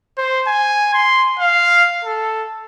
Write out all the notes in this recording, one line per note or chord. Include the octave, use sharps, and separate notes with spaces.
C5
G#5
C6
F5
A4